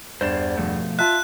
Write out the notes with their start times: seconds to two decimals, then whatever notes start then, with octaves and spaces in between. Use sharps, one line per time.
0.21 E2 G2 C5 D5 E7
0.57 B2 F3 A3
0.99 F4 E5 A5 F#6